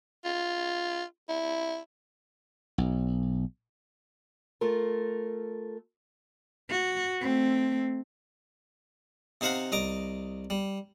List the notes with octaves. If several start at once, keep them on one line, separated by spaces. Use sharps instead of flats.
F4
E4
B1
A3 F4 A4 A#4
F#4
A3 C4
C3 D#4 C5 F5 F#5 A#5
C2 D#5 A#5 D6
G3